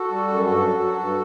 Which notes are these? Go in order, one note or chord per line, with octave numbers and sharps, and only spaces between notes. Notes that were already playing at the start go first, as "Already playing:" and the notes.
Already playing: F#4 A4
G3
F#2
G2 F#4 A4
F#3
F#3
G2